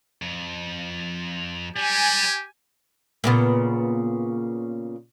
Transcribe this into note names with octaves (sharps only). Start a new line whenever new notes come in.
F2
G3 G4 G#5
A#2 C#3 B3